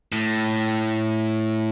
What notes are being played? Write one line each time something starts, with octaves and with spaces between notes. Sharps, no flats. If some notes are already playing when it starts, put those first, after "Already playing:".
A2